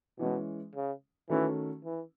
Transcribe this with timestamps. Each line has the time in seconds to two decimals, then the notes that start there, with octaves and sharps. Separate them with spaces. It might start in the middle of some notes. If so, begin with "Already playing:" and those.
0.19 B2 E3 G#3 C#4
0.75 C#3
1.30 D#3 E3 A3 C#4 F#4 A4
1.85 E3